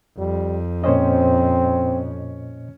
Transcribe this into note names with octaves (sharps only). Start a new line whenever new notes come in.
F2 G3
A#2 C4 C#4 C5 C#5 D#5